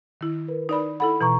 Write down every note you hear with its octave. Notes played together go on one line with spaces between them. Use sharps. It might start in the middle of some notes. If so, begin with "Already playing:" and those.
D#3 E4
A#4 B4
D#4 D5 B5
E4 A4 F#5 B5
B2 E3 B4 A#5 C#6